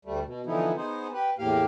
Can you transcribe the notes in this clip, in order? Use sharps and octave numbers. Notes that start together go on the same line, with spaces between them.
D2 G3 A3
B2
D3 E3 F3 B3 D#4 E4
B3 D#4 G#4 C5
G4 B4
E2 A2 A#3 G4 F5